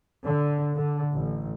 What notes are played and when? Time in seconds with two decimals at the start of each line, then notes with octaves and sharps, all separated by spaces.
0.24 D3
0.74 D3
1.12 A1